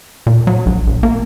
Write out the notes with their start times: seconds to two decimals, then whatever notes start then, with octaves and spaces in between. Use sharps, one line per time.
0.27 A#2
0.47 F#3
0.66 A#1
0.87 A#1
1.03 A#3